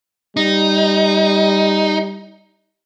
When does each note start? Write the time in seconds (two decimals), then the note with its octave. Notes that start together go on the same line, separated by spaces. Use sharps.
0.37 G3 D#4